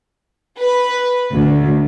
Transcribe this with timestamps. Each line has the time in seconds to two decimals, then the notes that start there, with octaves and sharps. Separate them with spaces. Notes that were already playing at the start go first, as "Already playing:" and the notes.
0.60 B4
1.33 D2